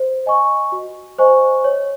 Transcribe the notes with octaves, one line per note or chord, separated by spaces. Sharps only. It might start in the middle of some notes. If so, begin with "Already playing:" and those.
Already playing: C5
D#5 G#5 C#6
F#4
C5 D#5 G#5 C#6
C#5